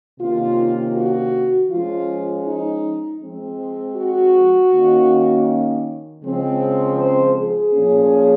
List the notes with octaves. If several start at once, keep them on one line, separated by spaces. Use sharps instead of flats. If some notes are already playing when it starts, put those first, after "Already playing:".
C3 D#3 A#3 C#4 F4
F#4
F3 G#3 C#4 F4
D#4
F3 G#3 C4
F#4
D#3 A#3 C#4
C#3 F3 G#3 C4
C5
G#4
A#2 F3 A#3 C#4